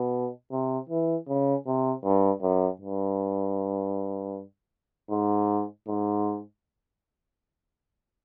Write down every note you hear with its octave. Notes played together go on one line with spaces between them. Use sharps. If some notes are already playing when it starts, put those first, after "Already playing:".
Already playing: B2
C3
E3
C#3
C3
G2
F#2
G2
G#2
G#2